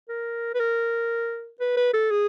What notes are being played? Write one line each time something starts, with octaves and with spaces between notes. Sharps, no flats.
A#4
B4
A#4
B4
B4
A4
G#4